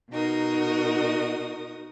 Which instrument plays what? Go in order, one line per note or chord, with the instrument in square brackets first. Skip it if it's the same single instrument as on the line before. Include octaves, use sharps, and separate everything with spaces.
[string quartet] B2 D#4 F#4 A#4 D#6